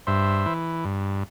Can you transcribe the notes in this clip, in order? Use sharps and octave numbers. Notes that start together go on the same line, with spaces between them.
G2 C5 E5
E3
G2